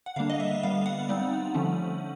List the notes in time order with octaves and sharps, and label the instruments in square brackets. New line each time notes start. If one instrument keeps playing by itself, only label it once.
[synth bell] F#5
D3 G3 A#3 D4 F5
D#5
E5
D3 G3 B3 F5
F#5
G3 C4 D#4
D3 F3 A3 C#4